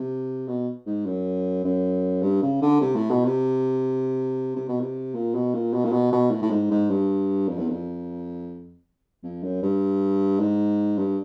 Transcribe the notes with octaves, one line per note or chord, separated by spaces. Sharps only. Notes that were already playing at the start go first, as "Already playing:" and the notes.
Already playing: C3
B2
G#2
F#2
F#2
G2
C#3
D3
C3
A2
B2
C3
C3
B2
C3
A#2
B2
A#2
B2
A#2
B2
B2
A2
A2
G#2
G#2
G2
F2
E2
F2
F2
F#2
G2
G#2
G2